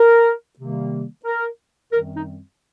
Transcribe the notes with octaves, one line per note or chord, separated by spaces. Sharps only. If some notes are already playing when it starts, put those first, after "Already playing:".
Already playing: A#4
C3 D#3 G3 A#3
A#4
F#2 D#3 G3 C4 A#4
D#4